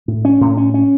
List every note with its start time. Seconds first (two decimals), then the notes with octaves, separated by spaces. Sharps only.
0.08 A2
0.25 C#4
0.41 A2
0.57 C#4
0.74 C#4